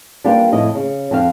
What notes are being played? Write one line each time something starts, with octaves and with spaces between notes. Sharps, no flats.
G3 A#3 D4 F4 G4 B4
F2 A2 E4 D#5
C#3
F2 C4 F#4 F5